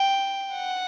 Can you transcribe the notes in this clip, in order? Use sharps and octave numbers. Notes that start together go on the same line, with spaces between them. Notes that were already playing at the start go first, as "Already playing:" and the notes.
Already playing: G5
F#5